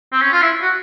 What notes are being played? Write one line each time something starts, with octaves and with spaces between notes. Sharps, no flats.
C4
C#4
F4
E4
F#4